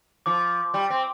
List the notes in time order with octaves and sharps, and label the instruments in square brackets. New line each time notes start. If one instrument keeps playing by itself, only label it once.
[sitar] F3 [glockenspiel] D6
[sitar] G3
C4